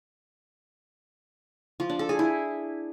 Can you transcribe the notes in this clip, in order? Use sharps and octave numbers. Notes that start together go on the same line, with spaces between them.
F3
D4
A4
G#4
E4